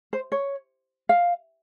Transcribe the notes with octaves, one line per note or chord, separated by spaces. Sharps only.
C5
C#5
F5